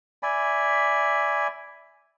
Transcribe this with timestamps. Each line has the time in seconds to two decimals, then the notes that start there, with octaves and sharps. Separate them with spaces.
0.23 D5 E5 G#5 B5